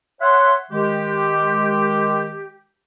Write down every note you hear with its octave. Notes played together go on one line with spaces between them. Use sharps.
C#5 E5 F#5 C6
D#3 G#3 G4